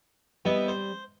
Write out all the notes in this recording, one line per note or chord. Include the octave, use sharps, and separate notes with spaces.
G3 B3 C4 E4 D#5
C5